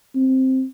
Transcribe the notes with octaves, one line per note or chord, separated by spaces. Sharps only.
C4